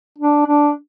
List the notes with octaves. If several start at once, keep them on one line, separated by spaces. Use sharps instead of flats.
D4
D4